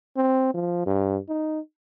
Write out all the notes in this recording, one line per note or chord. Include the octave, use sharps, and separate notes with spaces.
C4
F3
G2
D#4